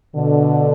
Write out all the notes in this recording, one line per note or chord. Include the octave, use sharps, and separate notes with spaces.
B2 D3